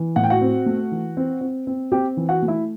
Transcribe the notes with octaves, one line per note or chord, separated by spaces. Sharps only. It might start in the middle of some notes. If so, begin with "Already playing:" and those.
Already playing: E3
A2 F#5
G5
F#4 F#5
C4
A3
E3
C4
C4
C4
C4 G4 G5
E3
F#4 F#5
A3
E4 E5